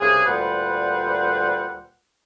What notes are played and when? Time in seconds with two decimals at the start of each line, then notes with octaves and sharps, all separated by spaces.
0.01 C2 C#3 D4 G#4
0.26 D2 A#2 G3 B4 C5 F#5